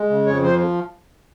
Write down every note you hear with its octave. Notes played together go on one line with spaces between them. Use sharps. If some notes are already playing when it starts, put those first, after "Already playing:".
Already playing: G#3
C#3
F2 C#5
F3 C5